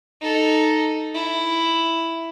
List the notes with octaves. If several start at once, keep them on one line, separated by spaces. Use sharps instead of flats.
D#4 A4
E4